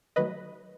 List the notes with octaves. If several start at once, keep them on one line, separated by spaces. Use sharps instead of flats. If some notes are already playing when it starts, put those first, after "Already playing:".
D#3 F#3 A3 B4 D#5